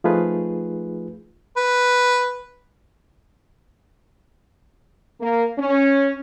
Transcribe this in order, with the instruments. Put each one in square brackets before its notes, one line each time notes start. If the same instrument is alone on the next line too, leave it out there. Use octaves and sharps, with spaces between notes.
[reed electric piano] F3 A3 D#4 F4 G#4 B4
[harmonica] B4
[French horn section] A#3
C#4